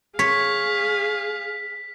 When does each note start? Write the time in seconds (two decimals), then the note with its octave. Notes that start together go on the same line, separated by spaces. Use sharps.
0.19 G#4 C#5 F5 B6